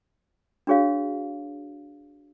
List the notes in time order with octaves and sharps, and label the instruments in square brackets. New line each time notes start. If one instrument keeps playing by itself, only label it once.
[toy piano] D4 F#4 G#4 C#5 F5